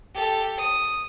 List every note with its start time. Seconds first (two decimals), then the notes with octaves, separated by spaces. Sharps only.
0.14 G4 A4
0.57 D#6